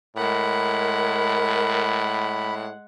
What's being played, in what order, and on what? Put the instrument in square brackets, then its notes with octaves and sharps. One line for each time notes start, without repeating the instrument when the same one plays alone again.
[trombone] A2 [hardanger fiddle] G#3 F#5 [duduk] A#4 [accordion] B5